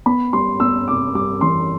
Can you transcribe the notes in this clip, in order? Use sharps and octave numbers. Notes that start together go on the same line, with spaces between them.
B3 B5
G3 C6
B3 E6
C3 D6
G3 D6
E3 C6